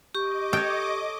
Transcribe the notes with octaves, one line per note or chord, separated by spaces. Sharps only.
G4 D#5 C#6 D6
A4 C#5 G5